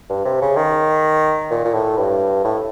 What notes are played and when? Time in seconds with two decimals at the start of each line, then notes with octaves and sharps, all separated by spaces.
0.10 G2
0.25 C3
0.41 C#3
0.57 D#3
1.51 A#2
1.65 A#2
1.74 A2
1.98 G2
2.45 A2